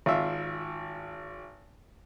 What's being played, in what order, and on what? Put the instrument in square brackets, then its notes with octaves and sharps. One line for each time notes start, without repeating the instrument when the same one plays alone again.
[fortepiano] G#1 F4 E5